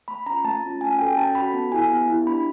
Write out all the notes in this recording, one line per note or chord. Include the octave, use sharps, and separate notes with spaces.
A3 B5
C#4 F4 A#5
A3 A5
C#4 F4
C#4 G#5
F#4 A4 G5
C#4 A5
F#4 A4 B5
B3
E4 G4 G#5
B3
E4 G4
D4 B5